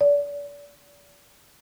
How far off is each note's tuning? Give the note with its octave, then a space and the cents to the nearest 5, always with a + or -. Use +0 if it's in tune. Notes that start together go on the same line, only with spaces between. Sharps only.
D5 -35